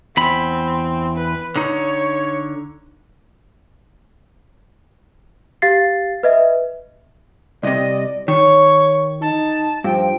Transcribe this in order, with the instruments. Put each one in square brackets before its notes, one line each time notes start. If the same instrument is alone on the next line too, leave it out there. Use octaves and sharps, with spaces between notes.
[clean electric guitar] E2 B5 [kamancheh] C4
[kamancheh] B4
[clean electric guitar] D3 D#4 [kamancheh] C#5
[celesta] G4 F5 A6 C7
B4 D#5 E5
[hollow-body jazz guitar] C2 C3 [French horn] D5 [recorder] D#5
[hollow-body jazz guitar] D#3 [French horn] C#5 [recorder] C#6
[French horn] D#4 [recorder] A5
[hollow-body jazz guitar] G2 [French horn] F3 [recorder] G5